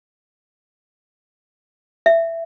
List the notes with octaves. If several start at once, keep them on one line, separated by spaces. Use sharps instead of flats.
E5